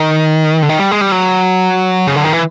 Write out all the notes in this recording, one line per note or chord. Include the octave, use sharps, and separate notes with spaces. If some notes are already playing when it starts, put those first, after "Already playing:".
Already playing: D#3
D3
D#3
G3
G#3
G3
F#3
C#3
D3
D#3
E3